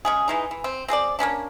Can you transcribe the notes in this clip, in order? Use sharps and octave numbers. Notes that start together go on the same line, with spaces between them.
C#3 G#3 G#4
E3 G#3 D#4
E3
C4
C4 G#4 B4 D5
A#3 B3 C#4 D4